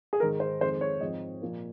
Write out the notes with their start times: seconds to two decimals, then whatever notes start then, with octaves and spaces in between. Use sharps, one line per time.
0.13 G#4
0.20 G#2 D#3 G#3 A#4
0.40 C5
0.61 F2 D#3 G#3 C5
0.81 C#5
1.01 G#2 F3 C4 D#5
1.41 A#2 F3 A#3